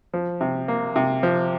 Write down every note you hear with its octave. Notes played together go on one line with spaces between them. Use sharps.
F3
C3
A#3
C3
F3